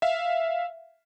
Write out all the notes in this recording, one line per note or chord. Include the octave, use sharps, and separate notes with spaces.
E5 F5